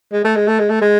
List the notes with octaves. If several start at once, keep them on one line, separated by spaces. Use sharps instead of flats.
G#3
A3
G#3
A3
G#3
A3
G#3